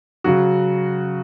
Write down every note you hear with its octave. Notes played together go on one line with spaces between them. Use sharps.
C#3 F#3 F#4